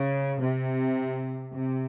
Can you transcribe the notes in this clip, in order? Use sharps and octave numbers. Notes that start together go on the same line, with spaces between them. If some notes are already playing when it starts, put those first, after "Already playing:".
Already playing: C#3
C3
C3